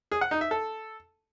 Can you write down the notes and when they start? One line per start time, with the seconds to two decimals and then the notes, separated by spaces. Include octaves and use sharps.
0.12 G#4
0.21 F#5
0.31 D#4
0.41 E5
0.51 A4